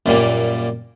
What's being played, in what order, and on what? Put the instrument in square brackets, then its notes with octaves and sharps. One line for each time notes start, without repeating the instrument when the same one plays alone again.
[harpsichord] F#2 A#2 G3 A#3